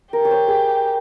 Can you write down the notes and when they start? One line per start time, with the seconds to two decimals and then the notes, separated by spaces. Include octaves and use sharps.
0.13 G4 A#4
0.25 C#5
0.31 C5
0.48 G#4